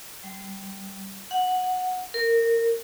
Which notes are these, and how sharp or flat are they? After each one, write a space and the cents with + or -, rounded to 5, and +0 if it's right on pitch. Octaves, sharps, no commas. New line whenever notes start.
G3 -10
F#5 -10
A#4 -20